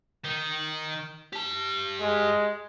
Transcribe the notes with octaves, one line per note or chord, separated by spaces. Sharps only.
D#3
G4 A5
G#3